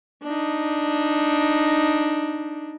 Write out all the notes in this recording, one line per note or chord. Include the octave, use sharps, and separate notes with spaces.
D4 D#4